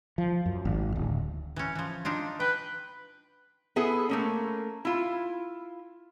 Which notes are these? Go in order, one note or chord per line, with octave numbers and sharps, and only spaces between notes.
F3
F#2
G#1
D1
E3 C#4
E3 F3
D4 D#4 F4
B4 G5
B3 E4 G#4 A4
A3 A#3 C#4
E4 F4